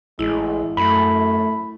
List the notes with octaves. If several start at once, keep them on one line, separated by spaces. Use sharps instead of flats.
A1 G#3 E4
F#2 A3 B5